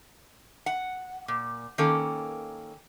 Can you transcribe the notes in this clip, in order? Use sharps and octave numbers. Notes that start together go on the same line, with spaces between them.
F#5
A#2
D#3 A#3 C#4 A4